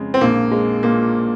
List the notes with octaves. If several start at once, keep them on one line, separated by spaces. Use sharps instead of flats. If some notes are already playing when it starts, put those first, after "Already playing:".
Already playing: F2 C#3 G#3
C4
A#1 A#3
G#3
A#2 A#3